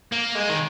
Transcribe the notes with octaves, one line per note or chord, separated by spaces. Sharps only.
A#3
G#3
D#3